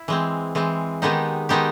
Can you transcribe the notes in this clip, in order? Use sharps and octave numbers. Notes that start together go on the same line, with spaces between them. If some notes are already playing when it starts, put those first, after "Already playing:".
Already playing: E4
E3 G#3 C4
E3 G#3 C4
D#3 G#3 B3 D#4 G4
D#3 G#3 B3 D#4 G4